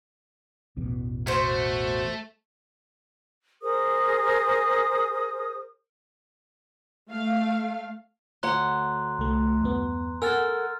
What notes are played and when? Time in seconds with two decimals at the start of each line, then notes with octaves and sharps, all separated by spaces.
0.77 A1 E2 B2
1.27 A3 F#4 C5
3.62 G#4 A#4 C5 D#6
7.10 A3 F5
8.43 D2 C#5 F#5 A#5 C6 F#6
9.19 C2 A3
9.61 E2 G2 B3
10.22 A4 A#4 F#5 G#5 E6 F6 A6